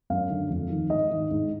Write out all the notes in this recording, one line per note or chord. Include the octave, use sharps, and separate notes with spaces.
F#2 F5
D3
F2
D#3
G#2 D#5
D#3
G#2